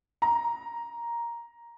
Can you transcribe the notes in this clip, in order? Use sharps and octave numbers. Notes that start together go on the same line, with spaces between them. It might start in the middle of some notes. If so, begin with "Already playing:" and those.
A#5